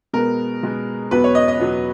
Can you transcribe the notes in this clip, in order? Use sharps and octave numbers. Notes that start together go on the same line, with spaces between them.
B2 G#3 B3 A#4
B2 G#3 B3
E2 B2 F#3 B3 B4
C#5
D#5
D#5
E2 B2 F#3 B3